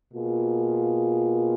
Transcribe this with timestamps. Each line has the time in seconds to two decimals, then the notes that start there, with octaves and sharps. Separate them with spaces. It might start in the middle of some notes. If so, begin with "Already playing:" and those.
0.12 B2 A#3 F4 G#4